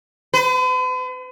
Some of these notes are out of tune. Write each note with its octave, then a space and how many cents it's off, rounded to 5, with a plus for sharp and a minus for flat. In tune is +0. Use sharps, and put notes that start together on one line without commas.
B4 +45